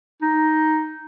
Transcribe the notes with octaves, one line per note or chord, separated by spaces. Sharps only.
D#4